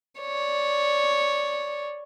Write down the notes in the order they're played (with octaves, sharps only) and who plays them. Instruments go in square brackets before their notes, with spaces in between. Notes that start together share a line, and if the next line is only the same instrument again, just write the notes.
[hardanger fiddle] C#5 D5